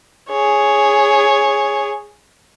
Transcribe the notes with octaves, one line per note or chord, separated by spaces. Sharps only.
G#4 C#5